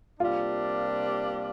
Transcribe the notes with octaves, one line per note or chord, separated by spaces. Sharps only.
C3 G3 A#3 D4 F4